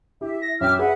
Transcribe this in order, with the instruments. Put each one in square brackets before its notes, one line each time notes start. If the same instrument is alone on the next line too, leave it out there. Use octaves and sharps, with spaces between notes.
[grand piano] E4 [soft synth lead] G4 [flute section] E5
[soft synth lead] A#6
[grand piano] F#2 G5 [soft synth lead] E5 [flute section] D6 F6
[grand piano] G#4 [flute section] B4 F#5